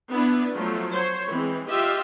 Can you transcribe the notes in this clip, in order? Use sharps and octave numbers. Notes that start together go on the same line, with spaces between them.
B3 D4 E4 B4
F3 F#3 A3
C5 C#5
E3 G#3 C4
F4 G4 D#5 E5